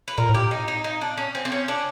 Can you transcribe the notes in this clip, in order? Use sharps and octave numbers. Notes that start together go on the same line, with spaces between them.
B4
A#2 A#4
A2 G4
A#2
D#4
D#4
D#4
D4
C#4
C4
C4
C#4
D4